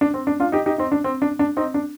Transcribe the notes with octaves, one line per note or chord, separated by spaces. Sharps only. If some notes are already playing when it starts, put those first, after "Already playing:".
D4
C4
D4
D4 F4
D#4 G4
D#4 G4
C4 D#4
D4
C4
D4
D4
C4 D#4
D4